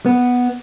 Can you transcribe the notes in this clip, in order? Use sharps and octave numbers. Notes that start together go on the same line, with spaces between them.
B3